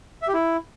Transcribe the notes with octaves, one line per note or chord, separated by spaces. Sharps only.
E5
G4
E4